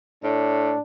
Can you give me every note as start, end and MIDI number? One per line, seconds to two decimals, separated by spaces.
0.24 0.74 45
0.24 0.80 62